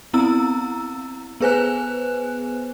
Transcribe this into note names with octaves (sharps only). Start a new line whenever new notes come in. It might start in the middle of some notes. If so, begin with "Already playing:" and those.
B3 C4 E4 A#5 E6
B3 G#4 B4 C5 G#5 F#6